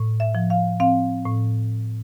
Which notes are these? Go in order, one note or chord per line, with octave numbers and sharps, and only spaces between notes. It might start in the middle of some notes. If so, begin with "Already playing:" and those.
Already playing: A2
E5
F3
F5
C4 F5
A2